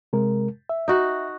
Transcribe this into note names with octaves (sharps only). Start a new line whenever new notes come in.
C3 G#3 A#4
E5
D#4 F#4